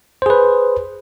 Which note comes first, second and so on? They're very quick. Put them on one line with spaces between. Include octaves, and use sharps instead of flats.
C5 G#4 B4